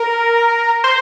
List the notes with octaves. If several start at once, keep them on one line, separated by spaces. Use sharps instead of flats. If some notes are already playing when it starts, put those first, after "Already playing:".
Already playing: A#4
C5